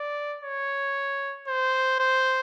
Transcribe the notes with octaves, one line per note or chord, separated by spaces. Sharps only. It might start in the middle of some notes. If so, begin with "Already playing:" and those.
Already playing: D5
C#5
C5
C5